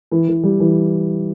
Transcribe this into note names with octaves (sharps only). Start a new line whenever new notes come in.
E3
E3
G3
E3